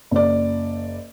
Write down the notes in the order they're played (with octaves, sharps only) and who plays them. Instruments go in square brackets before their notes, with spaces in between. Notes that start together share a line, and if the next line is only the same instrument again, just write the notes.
[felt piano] F#1 D5